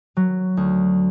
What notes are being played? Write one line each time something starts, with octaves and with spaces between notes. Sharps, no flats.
F#3
D2